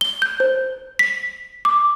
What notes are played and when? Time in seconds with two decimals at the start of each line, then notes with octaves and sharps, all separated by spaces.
0.01 G7
0.22 G6
0.40 C5
0.99 B6
1.65 D6